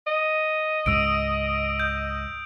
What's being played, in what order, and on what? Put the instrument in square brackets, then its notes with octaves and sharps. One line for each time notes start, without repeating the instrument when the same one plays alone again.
[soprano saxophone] D#5
[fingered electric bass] C#2 G#2 G#3 [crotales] D#6 E6 D7
[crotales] G6